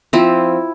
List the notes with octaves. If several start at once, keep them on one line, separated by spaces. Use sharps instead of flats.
F3 C4 E4